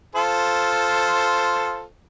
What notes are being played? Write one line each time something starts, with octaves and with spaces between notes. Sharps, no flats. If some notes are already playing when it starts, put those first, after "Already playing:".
F4 A4 C5